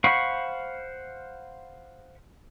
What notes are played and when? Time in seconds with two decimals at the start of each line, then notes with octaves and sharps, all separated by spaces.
0.04 C5 F5 F#5 B5 C#6